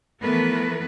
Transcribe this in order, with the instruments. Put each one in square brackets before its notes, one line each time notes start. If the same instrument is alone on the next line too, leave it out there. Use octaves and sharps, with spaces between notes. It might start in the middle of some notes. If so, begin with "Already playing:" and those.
[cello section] E3 F3 A3 B3 A#4 B4